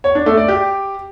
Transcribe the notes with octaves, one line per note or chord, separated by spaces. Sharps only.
C#5
D4
A3
D5
G4